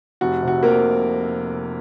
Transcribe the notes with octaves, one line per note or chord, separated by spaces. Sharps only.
F1 F#4
C3
F#4
F2 A#3 A#4